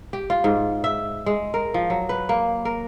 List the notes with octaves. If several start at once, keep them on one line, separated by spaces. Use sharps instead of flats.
G4
F4
G#2
E5
G#3
A#4
F3
F#3
B4
A#3
A#4